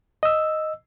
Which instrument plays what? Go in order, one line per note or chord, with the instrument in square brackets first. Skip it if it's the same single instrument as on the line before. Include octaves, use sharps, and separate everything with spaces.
[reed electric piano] D#5 E6